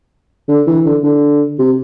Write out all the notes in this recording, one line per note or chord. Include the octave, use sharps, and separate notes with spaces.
D3
E3
D3
D3
C3